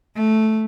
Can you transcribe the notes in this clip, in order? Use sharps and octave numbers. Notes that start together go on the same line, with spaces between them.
A3